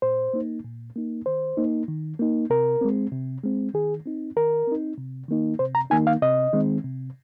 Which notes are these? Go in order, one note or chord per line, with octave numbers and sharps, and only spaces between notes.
A#2 C5
A#3 D#4
A#2
A#3 D#4
D#3 C5
A#3 D#4
D#3
A#3 D#4
C3 A#4
G#3 C4
C3
G#3 C4
D#3 G#4
C4 D#4
D#3 A#4
C4 D#4
C3
D#3 A#3 D#4
C3 C5
A#5
D#3 A#3 D#4 G#5
F5
C3 D#5
D#3 G#3 C4
C3